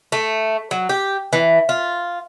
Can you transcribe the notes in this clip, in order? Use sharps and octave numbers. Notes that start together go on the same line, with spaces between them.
A3
F#3
G4
E3
F4